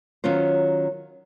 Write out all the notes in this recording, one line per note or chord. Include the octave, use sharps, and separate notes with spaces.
D#3 F#3 C#4 F4 C5